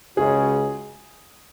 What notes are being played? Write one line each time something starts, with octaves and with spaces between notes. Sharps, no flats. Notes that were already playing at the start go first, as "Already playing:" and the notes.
C#2 C#3 G#3 C#4 F#4 G#4